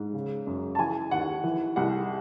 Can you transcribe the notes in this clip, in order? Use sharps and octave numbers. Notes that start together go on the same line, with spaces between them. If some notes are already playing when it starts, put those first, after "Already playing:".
Already playing: G#2
C#3
F#2
A5
E3 G#5
D#2 F#5
E3
C2 F#5